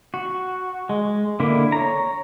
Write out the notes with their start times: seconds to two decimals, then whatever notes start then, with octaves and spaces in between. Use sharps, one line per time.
0.14 F#4
0.89 G#3
1.40 D3 A#3 E4
1.72 C#5 A#5